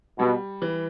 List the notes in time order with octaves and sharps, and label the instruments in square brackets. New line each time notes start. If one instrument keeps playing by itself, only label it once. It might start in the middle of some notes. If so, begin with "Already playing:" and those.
[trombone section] B2 [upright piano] G3
[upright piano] E3